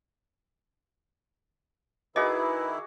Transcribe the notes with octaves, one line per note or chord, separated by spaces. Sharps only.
D#3 E4 F#4 G#4 B4 D#5 D6